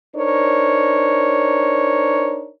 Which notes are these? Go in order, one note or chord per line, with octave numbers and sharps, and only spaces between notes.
D4 D#4 A#4 C5 C#5